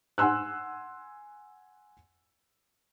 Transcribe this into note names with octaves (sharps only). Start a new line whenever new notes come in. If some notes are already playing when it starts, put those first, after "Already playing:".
F#5 G#5 C6 E6 F#6